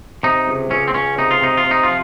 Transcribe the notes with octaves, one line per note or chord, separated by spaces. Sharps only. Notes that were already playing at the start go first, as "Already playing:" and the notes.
C3 D#4
C#2
C#2 C#4
C4
C#2 C#4
C3 D#4
F4
C3 D#4
F4
C3
D#4
F3 F4